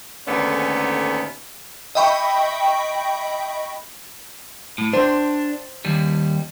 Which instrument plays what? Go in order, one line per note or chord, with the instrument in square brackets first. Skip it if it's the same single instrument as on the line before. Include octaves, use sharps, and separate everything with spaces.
[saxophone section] D#2 G#2 D3 A3 B3 C#4
[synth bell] D#5 E5 G5 B5 C#6
[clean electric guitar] A2
[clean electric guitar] D4 [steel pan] C5
[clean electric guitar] D#2 G3